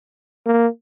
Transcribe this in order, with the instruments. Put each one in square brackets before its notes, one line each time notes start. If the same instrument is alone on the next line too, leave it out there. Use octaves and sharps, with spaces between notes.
[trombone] A#3